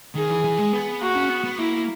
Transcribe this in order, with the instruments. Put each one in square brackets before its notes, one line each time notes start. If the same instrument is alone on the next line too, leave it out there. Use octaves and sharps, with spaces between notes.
[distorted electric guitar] D#3 [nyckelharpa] G#4
[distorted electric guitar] E3
E3
G#3
B3
[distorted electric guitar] A#3 [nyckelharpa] F#4
[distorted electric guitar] C#4
B3
B3
[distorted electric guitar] A#3 [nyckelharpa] E4